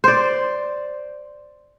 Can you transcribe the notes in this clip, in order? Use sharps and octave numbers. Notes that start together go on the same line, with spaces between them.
C5 D5